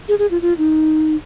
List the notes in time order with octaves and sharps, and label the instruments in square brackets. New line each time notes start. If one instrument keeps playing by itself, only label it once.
[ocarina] G#4
G#4
F4
F4
D#4